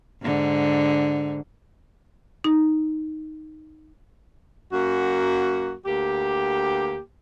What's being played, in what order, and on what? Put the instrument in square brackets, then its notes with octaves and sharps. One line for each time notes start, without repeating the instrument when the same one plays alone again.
[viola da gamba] G#2 D3
[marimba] D#4
[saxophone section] F#2 A#3 F#4
D2 A#3 G4